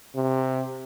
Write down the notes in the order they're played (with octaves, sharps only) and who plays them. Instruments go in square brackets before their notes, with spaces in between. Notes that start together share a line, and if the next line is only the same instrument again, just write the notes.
[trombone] C3